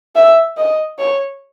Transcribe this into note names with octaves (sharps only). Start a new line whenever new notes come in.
E5
D#5
C#5